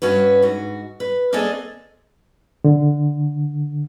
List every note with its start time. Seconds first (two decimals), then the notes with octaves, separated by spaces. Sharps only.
0.02 G2 C#4 F#4 B4
0.42 G#2 F#4
1.00 B4
1.33 A#3 C4 D4 G#4 A4 D#5
2.64 D3